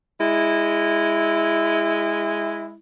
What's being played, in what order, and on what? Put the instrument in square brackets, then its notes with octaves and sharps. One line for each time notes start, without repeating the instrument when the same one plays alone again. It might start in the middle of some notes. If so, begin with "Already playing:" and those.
[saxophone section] G#3 E4